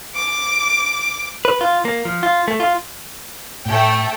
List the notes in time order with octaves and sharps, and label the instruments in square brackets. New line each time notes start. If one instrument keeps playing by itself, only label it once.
[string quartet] D6
[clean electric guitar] B4
F4
A#3
F3
F4
A3
F4
[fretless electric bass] A2 [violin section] A3 G5